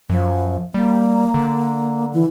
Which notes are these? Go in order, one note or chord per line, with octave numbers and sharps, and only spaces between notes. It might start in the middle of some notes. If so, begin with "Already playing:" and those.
F#2 F3
G3 A#3
D3
E3